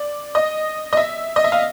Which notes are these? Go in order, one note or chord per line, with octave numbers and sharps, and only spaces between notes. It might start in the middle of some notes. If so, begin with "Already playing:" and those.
Already playing: D5
D#5
D#5
E5
D#5
E5
F5